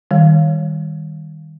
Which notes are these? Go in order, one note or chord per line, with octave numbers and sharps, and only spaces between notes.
D#3 G3